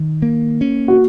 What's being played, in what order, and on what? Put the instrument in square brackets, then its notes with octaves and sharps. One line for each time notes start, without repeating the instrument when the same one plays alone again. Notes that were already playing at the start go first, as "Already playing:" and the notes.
Already playing: [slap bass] D#3
A#3
C#4
[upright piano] F#4